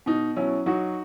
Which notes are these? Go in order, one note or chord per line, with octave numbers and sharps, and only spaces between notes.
B2 D#4
F#3 C#4 E4
F#3 D#4 F#4